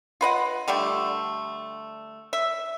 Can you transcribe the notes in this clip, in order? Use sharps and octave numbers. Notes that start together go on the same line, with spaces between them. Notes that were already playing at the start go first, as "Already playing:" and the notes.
F4 B4 D#5 F#5
D3 G3 A3 G4
E5